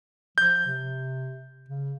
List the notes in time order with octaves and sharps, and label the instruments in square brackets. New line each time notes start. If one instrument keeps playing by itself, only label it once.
[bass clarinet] F3 [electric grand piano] G6
[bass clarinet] C3
C#3